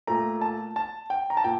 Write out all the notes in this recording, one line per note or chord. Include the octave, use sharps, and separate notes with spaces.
A#2 A3 A#5
A5
A5
G5
A#5
A5
A#2 G5